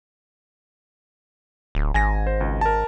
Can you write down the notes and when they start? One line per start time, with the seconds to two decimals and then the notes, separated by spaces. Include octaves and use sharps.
1.75 D1
1.94 G#1 G#5 A#6
2.27 C5
2.41 C#2
2.61 A#4 A5